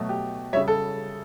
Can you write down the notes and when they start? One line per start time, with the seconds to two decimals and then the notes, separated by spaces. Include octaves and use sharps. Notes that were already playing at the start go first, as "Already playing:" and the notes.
Already playing: B2 F#3 A3
0.09 G4
0.53 G3 C#5 E5
0.57 C#3
0.68 A4